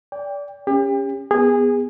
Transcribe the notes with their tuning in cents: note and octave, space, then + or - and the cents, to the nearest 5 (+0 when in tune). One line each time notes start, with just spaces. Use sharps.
D5 -25 G5 +20
C#4 +0 G4 +35
B3 +0 G#4 -20